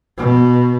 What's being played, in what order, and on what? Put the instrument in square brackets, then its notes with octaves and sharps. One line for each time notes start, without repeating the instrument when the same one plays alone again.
[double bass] B2